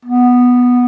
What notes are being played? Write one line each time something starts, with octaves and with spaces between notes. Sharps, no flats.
B3